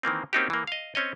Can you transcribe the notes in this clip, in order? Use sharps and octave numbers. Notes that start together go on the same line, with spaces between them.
D#3 E3 A#3 C4
A#3 C4 C#4 D#4 F#4 G4
E3 A#3
D#5 F5
C4 C#4 C#5 D#5